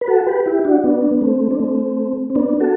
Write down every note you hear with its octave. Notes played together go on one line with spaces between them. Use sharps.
B4
F#4 A4
G4 B4
E4 G4
D4 F#4
B3 D4
B3
A3 C4
D4
A3 C4
C4
B3 D4
F#4 A4